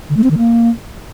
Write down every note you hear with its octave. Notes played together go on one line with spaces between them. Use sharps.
D3
A3
C4
D#3
A#3